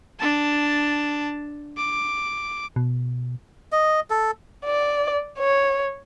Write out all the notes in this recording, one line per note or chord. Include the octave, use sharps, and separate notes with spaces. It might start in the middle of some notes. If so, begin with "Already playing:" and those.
D4 A5
D6
B2
D#5
A4
D5
C#5